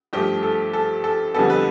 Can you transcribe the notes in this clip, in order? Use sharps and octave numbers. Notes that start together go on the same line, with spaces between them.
G2 F3 A3 G4
A4
A4
A4
F2 D3 G3 B3 A4
B4